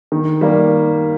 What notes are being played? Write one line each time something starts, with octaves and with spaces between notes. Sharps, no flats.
D#3
G3 A#3